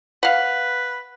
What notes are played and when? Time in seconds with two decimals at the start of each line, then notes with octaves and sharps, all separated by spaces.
0.23 B4 F5 F#5